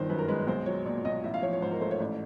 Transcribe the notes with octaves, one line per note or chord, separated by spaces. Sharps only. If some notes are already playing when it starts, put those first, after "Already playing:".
Already playing: G1 D#3 C5 D5
F#2 B4
A#4
G#3 B4
B1 C5
F#3 C#5
A#2 D5
B1 D#5
A1 E5
F5
F3 C#5
C#5
G#2 C5
A#4
A3 C5
C#5
A1 D5